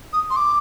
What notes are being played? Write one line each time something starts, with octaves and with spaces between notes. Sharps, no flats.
D#6
C6
D6